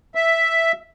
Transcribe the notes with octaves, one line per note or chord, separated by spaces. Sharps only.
E5